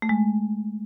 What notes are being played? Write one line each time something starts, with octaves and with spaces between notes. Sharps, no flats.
A3
G#3